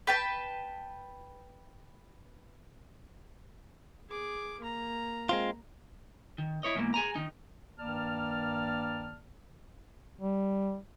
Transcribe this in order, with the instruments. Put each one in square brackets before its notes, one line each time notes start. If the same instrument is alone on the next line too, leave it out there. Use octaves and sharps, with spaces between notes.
[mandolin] B4 G5 A5
[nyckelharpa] G#4 D6
A#3 A#5
[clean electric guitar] G#3 C4 F4
D#3
E4 C#5 D#5
E2 G#2 A#3
G#4 G#5 A#5
D#3 D#4
[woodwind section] G2 D#3 A#3 D5 A5 F6
[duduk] G3